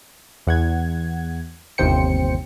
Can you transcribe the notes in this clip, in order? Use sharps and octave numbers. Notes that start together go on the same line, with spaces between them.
E2 F#5 G#6
G1 D#2 C3 C5 G5 C#7